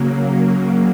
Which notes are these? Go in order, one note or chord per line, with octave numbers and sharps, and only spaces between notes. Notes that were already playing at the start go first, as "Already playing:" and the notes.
Already playing: C#3 F#3 A#3